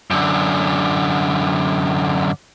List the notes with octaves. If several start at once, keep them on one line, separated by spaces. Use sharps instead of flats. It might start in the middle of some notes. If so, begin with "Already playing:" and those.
F#2 D3